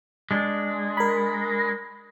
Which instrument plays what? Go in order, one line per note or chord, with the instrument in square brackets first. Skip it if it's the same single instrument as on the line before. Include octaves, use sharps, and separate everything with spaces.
[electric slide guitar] G#3 D4
[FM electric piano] A#4 B5